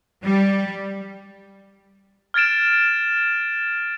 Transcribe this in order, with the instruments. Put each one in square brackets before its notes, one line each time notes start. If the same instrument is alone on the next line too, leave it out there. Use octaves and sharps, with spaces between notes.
[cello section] G3
[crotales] F6 G#6 A6 D7 E7